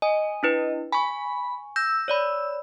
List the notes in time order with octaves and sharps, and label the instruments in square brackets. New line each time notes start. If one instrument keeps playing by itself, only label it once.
[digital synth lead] D#5 [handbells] G#5
[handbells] D4 E4 B4
[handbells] G#5 C#6 [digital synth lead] B5
[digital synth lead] E6 [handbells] G6 A#6
[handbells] C#5 D5 B5